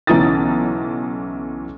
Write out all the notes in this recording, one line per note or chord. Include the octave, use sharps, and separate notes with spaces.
B1 C#3 E3 A#5 D#6 A6